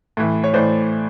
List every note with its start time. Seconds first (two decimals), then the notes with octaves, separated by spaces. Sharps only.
0.17 A2 E3
0.44 C#5
0.53 A2 E3 C5 D5